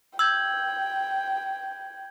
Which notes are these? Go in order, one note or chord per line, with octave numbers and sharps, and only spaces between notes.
G5 E6 G6 G#6 F#7